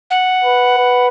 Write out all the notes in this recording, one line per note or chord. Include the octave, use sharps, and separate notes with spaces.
F#5
B4
B4